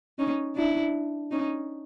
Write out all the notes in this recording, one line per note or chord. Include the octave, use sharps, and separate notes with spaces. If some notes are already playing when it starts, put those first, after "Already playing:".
C#4 D#4
D4 E4
C#4 D#4